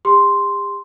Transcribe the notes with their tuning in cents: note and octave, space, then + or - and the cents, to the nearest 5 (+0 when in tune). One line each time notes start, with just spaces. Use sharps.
G4 +45 C6 -5